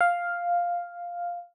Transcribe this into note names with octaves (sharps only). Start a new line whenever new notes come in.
F5